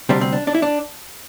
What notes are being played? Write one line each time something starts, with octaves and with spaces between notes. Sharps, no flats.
D2 C3 G3 C4 D4
C4
D4
D4
E4
D4